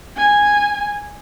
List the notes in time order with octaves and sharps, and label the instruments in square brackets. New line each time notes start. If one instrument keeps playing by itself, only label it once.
[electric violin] G#5